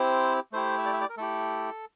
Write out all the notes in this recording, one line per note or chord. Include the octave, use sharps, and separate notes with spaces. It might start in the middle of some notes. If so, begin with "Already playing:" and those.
Already playing: C4 E4 G4 C5
A3 E4 G4 C5
E5
D5
E5
D5
A#4
A3 E4 G4 A4